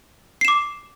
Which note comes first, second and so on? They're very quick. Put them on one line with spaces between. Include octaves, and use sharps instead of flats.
C7 E7 D6